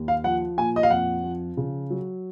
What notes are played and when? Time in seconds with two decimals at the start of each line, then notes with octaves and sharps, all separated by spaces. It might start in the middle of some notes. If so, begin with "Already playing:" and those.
Already playing: D#2
0.08 F5
0.24 F3 F#5
0.58 A#2 G#5
0.76 D#5
0.83 F5
0.90 F2 F#5
1.24 F3
1.57 C#3
1.90 F#3